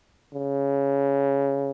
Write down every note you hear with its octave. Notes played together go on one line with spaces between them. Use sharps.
C#3